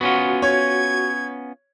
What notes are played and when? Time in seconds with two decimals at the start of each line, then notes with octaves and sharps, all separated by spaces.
0.01 B3 C#4 F4 F#4
0.42 C#5 G#6